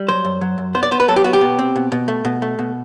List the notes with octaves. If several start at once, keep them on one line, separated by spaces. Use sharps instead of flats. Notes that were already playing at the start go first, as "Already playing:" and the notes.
Already playing: G3
F#3 C5
F#2
F#3
F#2
B3 C5
D5
B3 C5
B4
F#3 A4
G4
B3 F#4
G4
B2
C4
B2
B2
A3
B2
A3
B2